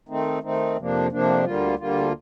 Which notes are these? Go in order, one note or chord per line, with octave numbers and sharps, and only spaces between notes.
D#3 A3 C4 D#4
D#3 A3 C4 D#4
F2 C3 F3 A#3 D4
F2 C3 F3 A#3 D4
D2 D3 G3 A#3 F4
D2 D3 G3 A#3 F4